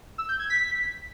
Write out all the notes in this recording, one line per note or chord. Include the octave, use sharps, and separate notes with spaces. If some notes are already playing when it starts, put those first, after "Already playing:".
E6
G6
G#6
B6